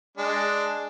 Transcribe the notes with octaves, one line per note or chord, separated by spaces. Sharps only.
G#3 D4